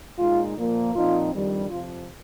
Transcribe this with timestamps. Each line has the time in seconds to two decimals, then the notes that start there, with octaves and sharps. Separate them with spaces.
0.18 A#2 G#3 D#4 F4
0.56 A#2 F3 A#3
0.94 A#2 F3 C4 D#4 F4
1.31 F2 D#3 G3 D4
1.69 F2 C3 F3 F4